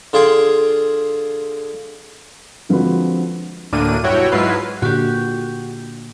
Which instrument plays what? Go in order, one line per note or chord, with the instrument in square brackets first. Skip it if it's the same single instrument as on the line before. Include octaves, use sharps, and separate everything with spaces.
[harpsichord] D3 F4 G#4 G5 C6
[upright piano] D3 F3 G#3 C4 F#4 B4
[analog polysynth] D2 A2 D3 A#3 D4 D#7
B1 G2 E4 F#4 C#5 G5
G#2 F#3 E4 F4 B4 C7
[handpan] A#2 D3 [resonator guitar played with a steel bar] F#4 G4